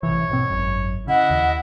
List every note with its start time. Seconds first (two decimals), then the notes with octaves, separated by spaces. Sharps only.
0.03 A1 C3 E3 C#5
0.29 G#2 B2 C4
0.50 G#1 F#2
1.07 C#3 E4 D#5 F#5
1.30 D#2